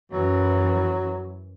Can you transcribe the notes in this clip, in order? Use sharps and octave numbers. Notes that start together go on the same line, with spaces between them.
F#2 E3 F#3